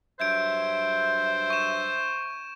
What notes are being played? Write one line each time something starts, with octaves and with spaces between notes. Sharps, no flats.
G2 F#3 C5 E5 G6 G#6 D7
C#6 E7